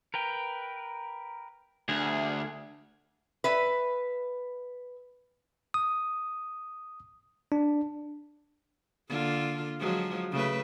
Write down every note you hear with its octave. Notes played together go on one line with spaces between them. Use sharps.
A#4 B4 G5
D2 G#4
B4 E5
D#6
D4
D3 A#3 F4
F3 F#3 G#3
C#3 A3 B4